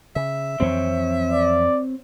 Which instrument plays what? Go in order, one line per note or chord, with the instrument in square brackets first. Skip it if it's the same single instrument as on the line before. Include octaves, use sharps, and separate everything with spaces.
[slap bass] C#3 [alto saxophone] E5
[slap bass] F2 E3 F#3 [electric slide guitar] C4 C5 C#5
[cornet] D5